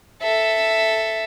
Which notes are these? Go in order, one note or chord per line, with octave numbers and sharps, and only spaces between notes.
A4 E5